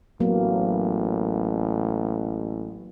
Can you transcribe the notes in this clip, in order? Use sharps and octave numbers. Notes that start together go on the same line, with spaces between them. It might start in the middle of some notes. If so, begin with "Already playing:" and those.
A1 F#3 A#3 B3